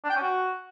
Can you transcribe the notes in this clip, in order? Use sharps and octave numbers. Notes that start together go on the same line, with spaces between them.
D4
G5
C#4
F#4